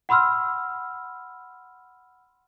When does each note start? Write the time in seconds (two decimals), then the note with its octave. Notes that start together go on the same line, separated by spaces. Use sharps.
0.09 F#5 B5 C6 E6 F6